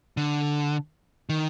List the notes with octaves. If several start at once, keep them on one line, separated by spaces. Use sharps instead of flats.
D3
D#3